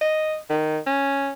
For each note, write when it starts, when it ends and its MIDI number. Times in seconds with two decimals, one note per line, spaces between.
0.01 0.37 75
0.50 0.78 51
0.87 1.31 61